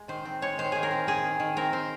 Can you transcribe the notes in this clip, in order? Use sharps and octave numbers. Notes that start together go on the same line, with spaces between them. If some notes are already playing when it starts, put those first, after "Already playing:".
Already playing: G#3
D#3 C5
C4
G#3 C#5
D#3 C5
D#3 G#4
A#4
C4
C4 G#4
D#3
D#3
C4 A#4
C4 C5